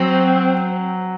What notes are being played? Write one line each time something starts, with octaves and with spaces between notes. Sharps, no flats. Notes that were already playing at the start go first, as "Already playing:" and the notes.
Already playing: F#3 C4